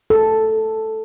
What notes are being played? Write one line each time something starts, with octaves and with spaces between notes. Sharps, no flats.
A4